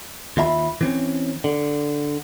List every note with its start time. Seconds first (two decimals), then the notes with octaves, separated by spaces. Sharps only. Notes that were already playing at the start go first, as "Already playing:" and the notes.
0.37 D#2 F4 E5 A#5 B5
0.81 E3 C4 C#4
1.44 D3